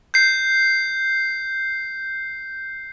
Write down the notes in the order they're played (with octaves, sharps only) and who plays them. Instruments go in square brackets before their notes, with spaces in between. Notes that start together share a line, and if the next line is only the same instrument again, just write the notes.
[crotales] G6 C7